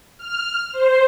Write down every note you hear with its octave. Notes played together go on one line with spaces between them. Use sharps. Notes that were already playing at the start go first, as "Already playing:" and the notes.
F6
C5